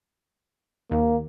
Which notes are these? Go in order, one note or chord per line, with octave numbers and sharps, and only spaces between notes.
D#2 A#3